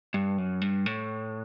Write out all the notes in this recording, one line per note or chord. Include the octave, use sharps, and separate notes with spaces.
G2
F#2
G2
A2